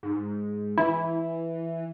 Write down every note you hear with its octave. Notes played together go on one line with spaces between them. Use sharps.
G#2
E3 E4